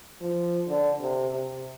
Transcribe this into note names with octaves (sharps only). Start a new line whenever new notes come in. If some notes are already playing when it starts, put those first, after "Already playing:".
F3
D3
C3
C3